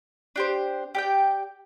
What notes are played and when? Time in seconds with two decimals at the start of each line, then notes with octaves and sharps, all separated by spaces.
0.36 D4 G4 C5
0.95 G4 D5 G5